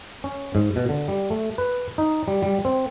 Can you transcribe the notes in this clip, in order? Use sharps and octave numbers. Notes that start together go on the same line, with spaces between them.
C#4
G#2
B2
D3
G3
A3
B4
D#4
G3
G3
C4